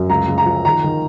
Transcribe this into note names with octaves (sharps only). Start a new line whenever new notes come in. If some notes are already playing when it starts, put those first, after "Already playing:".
Already playing: F#2
C#2 A#5
C#2
A#5
F3
D#3 A#5
D#3